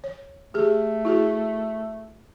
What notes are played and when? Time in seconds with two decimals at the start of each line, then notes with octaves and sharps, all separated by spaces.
0.04 C#5
0.54 A3 G4 G#4
1.05 E4 F#4 G#4